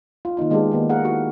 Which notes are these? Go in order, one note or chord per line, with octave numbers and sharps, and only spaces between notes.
F4
D#3 A#3 D#4 F4
D#3 G#3 B3 D4 G4 G#4
D#3 A#3 B3
G#4 A#4 F5 F#5
E4 F#4 G4